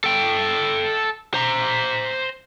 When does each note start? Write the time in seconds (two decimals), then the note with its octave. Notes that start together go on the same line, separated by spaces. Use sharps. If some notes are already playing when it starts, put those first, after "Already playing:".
0.04 A4 G5
1.34 C5 A#5